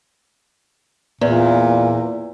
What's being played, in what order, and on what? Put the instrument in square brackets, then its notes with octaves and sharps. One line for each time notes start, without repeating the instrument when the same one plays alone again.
[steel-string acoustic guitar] E2 [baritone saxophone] A#2